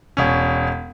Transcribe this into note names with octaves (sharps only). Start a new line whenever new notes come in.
E1 C#4